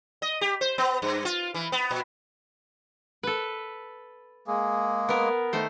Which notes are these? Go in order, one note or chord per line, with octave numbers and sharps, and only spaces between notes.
D#5
G4
C5
B3
G2
F4
E3
B3
A#2
A4 B4
G#3 A#3 G#4
B3 A#4
D#3 A3 C5